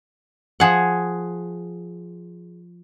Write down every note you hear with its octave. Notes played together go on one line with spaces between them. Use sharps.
F3 G#4 F#5